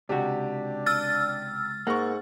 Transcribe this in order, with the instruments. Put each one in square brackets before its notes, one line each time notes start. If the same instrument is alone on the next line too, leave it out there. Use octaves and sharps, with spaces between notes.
[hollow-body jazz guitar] C#2 F#4 [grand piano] C3 G4 [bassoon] D4
[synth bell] E6 F6 A6
[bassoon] G#2 [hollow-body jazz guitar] A#3 [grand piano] F#5 C#6